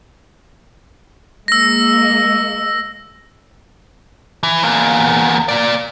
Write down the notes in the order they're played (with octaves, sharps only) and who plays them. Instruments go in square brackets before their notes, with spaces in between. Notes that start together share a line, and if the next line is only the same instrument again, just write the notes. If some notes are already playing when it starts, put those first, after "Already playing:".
[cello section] G#3 A#3 [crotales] E6 A#6
[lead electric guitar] E3
E2 A#3
A#3 D5